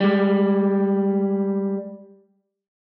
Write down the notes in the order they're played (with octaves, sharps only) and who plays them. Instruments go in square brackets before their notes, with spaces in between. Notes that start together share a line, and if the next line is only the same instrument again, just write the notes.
[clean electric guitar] G3 G#3